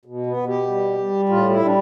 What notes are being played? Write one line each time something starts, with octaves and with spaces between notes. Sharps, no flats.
B2
B3
B2
G4
G3
G3
A2 F4
E4
G3
D4